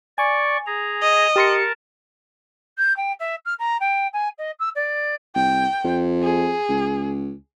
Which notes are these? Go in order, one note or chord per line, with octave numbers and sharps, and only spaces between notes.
D5 G#5 C#6
G#4 A#5
D#5
G4 A#4 A5 C6 C#7
G6
G5
E5
F6
A#5
G5
G#5
D#5
E6
D5
C2 G5
F2
G#4
C#2